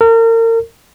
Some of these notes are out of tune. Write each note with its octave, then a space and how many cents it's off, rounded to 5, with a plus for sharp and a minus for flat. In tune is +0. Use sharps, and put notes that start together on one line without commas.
A#4 -35